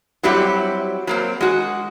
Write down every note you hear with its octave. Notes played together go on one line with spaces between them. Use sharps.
F#3 G3 C4 E4 G4 F#5
F#3 A#3 C4
G#3 F#4